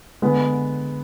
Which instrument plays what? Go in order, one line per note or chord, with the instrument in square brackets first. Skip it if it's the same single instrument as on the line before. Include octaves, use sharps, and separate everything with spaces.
[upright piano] D3 G#3 B3